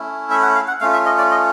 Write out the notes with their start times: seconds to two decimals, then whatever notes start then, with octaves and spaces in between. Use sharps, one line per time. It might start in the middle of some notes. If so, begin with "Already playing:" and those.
Already playing: A3 C#4 E4
0.31 E5
0.43 F#5
0.55 F5
0.68 F#5
0.81 A3 C#4 F4 F5
0.93 E5
1.06 D#5
1.18 D5
1.31 D#5